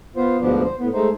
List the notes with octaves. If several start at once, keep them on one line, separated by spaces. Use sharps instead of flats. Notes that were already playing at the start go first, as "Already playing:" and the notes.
B3 F4 C5
D2 G#2 B2 F3 B3 D4
C5
A2 B3
G#3 A3 D#4 C5